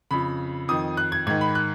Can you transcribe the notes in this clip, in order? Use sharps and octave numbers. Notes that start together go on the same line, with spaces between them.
F2 C#3 B5
F2 D#3 D#6
F#6
G#6
G#2 D#3 G#6
B5
F#6